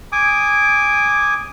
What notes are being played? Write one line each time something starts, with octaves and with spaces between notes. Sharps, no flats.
G#5 D6 D#6